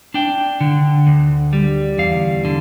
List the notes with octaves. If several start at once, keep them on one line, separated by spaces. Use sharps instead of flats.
D4 G5
D3
D2
G3
E2 F5
D3